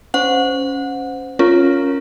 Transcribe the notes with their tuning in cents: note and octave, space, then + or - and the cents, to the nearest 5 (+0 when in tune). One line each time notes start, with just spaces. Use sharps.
C#4 +0 C5 -20 F#5 -25
C#4 -5 F4 +0 A#4 +0